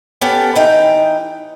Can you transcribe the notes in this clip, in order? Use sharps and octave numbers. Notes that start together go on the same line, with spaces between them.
B3 C#4 G4 A4
E3 D#4 G5